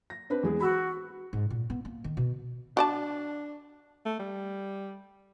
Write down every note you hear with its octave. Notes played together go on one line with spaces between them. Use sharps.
A#6
C4 D4 B4
E2 G#3 G#4
F#4 B5 E6
G#2
A#2
B3
A#3
D#3
B2
D4 F#4 D5 A5
A3
G3